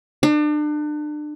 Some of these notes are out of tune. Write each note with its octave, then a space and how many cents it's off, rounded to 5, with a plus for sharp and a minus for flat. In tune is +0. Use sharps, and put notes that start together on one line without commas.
D4 +35